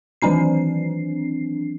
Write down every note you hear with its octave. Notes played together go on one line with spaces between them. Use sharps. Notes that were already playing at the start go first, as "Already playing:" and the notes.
D#3 E3 F#3 C4 D4 C7